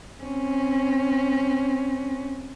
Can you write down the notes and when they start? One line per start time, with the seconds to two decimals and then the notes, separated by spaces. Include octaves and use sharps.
0.22 C4 C#4